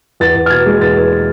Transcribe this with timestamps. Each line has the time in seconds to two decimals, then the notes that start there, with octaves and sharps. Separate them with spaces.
0.20 E2 A6
0.35 E2
0.46 F6
0.50 B2 G#6
0.66 G#3
0.81 E2 A6
0.97 E2